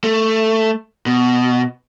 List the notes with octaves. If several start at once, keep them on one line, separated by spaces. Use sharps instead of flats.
A3
B2